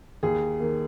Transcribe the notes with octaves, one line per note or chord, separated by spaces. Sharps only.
D#2 G#4
D#3 A#3